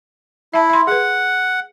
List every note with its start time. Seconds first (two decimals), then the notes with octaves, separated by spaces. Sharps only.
0.54 E4 E5 A5
0.70 E5 C6
0.87 G#4 B4 F#5